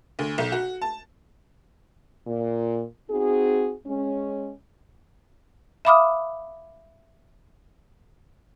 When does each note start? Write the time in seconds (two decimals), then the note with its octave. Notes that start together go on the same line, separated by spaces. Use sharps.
0.19 D2
0.38 B1
0.52 F#4
0.82 A5
2.27 A#2
3.10 C4 D#4 F#4 G#4
3.85 G#3 C#4
5.85 E5 F5 B5 D6 D#6 F6